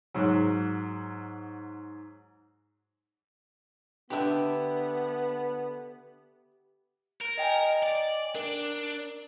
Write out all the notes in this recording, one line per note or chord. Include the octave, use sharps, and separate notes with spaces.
G#2 F#3
D3 B3 D4 G4 E5 B5
A#4
D#5 G5 G#5
D5
D4 A#4